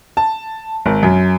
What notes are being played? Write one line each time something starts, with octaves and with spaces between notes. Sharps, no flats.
A5
G#1
F#2